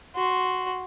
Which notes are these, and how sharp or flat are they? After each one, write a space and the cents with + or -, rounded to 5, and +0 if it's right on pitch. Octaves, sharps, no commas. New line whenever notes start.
F#4 +0 C6 +0